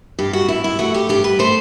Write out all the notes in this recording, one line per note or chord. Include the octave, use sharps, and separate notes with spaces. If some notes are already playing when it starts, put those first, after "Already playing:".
G2 G4
F#4
G2 E4
E4
A3 F#4
G4
G2 G4
B4
A3 C5